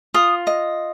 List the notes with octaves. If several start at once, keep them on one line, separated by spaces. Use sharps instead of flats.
F4 D#6
D#5